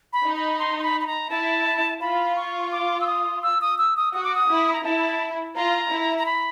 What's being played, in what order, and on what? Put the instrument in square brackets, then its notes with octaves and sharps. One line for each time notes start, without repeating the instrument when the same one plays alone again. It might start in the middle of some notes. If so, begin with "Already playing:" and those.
[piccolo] B5
[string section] D#4
[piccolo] B5
C6
C6
B5
B5
A#5
[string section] E4 [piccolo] A5
[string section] F4 [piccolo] B5
[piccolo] C#6
D6
E6
D#6
E6
D#6
E6
D#6
[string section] F#4 [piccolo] D#6
[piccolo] D6
D#6
[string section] E4
[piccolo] A#5
[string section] E4 [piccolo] A5
[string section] F4 [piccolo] A#5
[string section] E4
[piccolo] A#5
B5